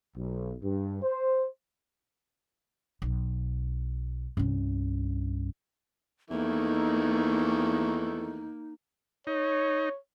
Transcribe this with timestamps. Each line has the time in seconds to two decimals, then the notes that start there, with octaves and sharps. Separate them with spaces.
0.16 B1
0.63 G2
1.03 C5
3.02 B1
4.37 C2 G2 C3 C#4
6.31 E2 D#3 E3 A3 A#3 D#4
9.27 D#4 C#5